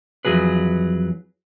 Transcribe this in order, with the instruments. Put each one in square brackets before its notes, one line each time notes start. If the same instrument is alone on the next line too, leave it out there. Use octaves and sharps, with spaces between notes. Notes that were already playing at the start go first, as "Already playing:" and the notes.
[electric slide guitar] F2 B2 E3 F#3 G#4 B4